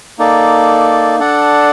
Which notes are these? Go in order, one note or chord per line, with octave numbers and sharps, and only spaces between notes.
A#3 D#4 A4 D5
D4 A4 D5 F#5